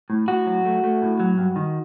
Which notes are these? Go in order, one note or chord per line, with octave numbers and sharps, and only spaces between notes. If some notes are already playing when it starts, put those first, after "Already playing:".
A2
A2 F#4
F#3
A3
A3
A2
F#3
G2
D#3